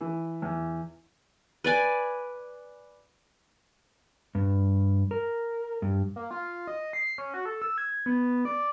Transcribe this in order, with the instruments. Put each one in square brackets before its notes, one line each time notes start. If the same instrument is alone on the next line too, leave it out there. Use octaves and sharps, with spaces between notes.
[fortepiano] E3
E2
[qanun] B4 D5 G#5
[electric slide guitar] G2
A#4
G2
[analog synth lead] A#3
F4
D#5
C7
C#4
F#4
A4
E6
G#6
B3
D5